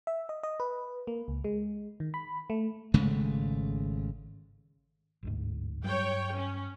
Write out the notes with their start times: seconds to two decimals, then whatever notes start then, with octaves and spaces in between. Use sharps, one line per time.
0.07 E5
0.29 D#5
0.43 D#5
0.60 B4
1.07 A#3
1.28 C#2
1.44 G#3
2.00 D#3
2.14 B5
2.50 A3
2.94 G#1 C#3 G#3 A3
5.23 G1 D2 G#2
5.84 G2 F#3 G3 C#5 G5
6.35 C#4